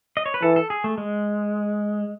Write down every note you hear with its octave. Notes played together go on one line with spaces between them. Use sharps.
D#5
C#5
B4
E3 A4
A4
G#4
A3
G#3